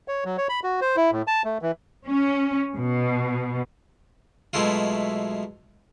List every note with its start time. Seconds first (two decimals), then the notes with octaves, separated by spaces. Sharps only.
0.08 C#5
0.25 F#3
0.38 C#5
0.49 B5
0.64 F#4
0.81 C5
0.96 E4
1.12 A2
1.27 A5
1.45 A3
1.62 E3
2.07 C#4
2.77 B2
4.53 B2 F#3 G#3 A3 E4 F4